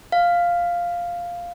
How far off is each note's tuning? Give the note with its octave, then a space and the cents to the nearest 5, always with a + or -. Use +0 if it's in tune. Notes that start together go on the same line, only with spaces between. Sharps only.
F5 +0